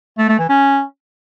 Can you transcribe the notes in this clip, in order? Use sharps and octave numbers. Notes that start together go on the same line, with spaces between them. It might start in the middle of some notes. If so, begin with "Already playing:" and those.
A3
A3
E3
C#4